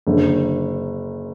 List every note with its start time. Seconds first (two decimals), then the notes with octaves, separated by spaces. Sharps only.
0.07 F#1 F#2 D3